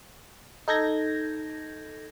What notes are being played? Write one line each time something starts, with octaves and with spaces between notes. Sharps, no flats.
D#4 A4 G6 G#6 A#6